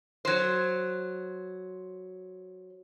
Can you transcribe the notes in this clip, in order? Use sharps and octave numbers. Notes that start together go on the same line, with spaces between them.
F#3 C5